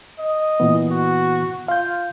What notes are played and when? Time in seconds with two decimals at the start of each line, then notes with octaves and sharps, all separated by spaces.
0.19 D#5
0.60 A#2 E3 B3
0.91 F#4
1.68 F4 F5 G6